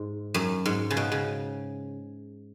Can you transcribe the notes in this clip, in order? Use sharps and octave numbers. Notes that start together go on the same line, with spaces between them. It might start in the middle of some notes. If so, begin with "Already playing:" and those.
Already playing: G#2
F#2
G#2
C#3
B2
C#3